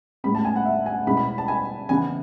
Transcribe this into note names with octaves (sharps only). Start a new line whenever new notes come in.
A2 G#3 B3 B5
A5
G#5
F#5
E5
G#5
B2 G#3 B3 E4 B5
B5
A5
G#5
C#3 E3 B3 E4 G#5